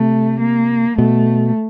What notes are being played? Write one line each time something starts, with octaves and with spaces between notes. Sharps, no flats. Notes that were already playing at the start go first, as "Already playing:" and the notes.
Already playing: C3 A3
A#3
B2 A3